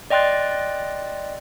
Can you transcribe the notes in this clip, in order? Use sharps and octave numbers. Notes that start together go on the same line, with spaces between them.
D5 D#5 G5 C6 F#6 A6